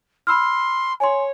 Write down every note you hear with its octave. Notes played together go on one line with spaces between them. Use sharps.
B5 C6 E6 F6
C#5 G#5 C6